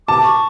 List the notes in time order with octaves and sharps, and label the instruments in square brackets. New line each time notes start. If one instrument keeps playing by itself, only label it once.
[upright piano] A5 [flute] D6
[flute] C#6